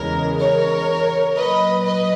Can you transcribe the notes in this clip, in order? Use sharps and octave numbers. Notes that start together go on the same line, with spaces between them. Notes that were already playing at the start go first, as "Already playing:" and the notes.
Already playing: E2 C#3 E3 G#3 A#4
A#4 C#5
A#2 F#3 B4 D#5
B4 D#5